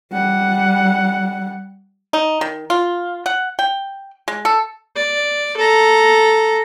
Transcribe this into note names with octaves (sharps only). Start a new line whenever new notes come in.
G3 F#5
D#4
D#3
F4
F#5
G5
G#3
A4
D5
A4 A#5